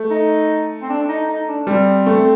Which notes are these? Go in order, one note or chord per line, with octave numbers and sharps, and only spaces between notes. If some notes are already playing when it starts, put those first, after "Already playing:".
Already playing: A3
D#4
C4
D4
D#4
D#4
D4
D4
G3 C4
A3